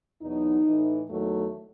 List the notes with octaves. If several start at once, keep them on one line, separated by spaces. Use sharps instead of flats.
E2 B2 F#3 D#4
A2 E3
E2 D#3 F#3 A3